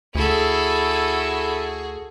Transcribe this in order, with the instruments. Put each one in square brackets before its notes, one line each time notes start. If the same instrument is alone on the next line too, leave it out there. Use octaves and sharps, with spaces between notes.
[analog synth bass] D2 [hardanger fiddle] E4 A4 [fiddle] F#4 G#4